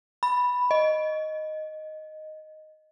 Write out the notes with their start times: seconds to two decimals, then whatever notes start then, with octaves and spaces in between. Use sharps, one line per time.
0.23 B5
0.71 D#5